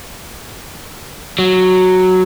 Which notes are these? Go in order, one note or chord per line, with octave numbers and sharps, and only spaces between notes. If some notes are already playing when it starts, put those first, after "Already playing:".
F#3